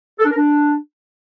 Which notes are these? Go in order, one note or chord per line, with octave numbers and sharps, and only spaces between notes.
A4
D4
A#4
D4